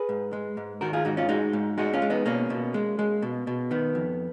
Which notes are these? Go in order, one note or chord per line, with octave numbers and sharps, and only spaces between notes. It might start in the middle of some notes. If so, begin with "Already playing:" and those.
Already playing: G#4 B4
G#2
G#3
G#2
D#3 F#4 A#4
F4 G#4
G#2 D#4 F#4
C#4 F4
G#3 D#4 F#4
G#2
G#3 D#4 F#4
C#4 F4
G#3
B3 D#4
B2 A#3 C#4
B2
G#3
G#3
B2
B2
D#3 B3
F2